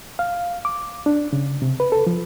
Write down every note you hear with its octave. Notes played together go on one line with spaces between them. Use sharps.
F5
D6
D4
C#3
C3
B4
A4
F3